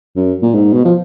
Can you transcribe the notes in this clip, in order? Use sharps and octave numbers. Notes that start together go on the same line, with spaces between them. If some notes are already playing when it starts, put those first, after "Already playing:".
F#2
A#2
G#2
B2
F3